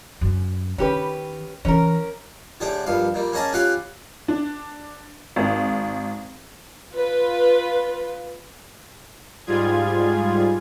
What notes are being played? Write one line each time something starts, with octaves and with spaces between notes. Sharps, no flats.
F#2
D#3 C#4 G4 B4
E3 C#4 A#4
A2 D3 G4 G#4
A#1 G2 F5
A#2 G3
A#3 C#4 G#4 D#5 G#5 A5
C#4 F4 G4 F5 F#5 B5
D4
G#1
F4 B4
G#2 G3 F4 G#4 G#6